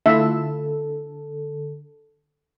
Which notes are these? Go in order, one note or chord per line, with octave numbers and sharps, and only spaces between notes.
D3 A3 E4 F4 A4 E5